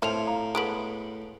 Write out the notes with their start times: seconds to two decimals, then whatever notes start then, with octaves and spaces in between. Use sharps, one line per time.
0.02 A2 C4 F4 E5 A5 F7
0.27 F5 A#5
0.55 G#3 A3 B3 D7 F#7